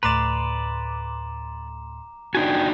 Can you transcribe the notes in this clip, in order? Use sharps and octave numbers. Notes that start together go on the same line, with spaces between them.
D2 A2 B4 D5 A#5 C6 D6 E7
D4 D#4 F#4 G5 G#5